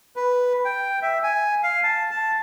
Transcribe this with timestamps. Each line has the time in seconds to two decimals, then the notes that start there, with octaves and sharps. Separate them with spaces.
0.16 B4
0.65 G5
1.02 E5
1.23 G#5
1.63 F5
1.83 A5
2.11 A5